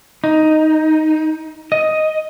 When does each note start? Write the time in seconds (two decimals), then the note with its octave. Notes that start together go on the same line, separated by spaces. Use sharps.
0.24 D#4
1.72 D#5